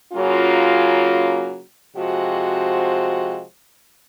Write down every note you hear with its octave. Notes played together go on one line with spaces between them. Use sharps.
C#3 F#3 A#3 C#4 F4
C3 F3 G#3 C4 F#4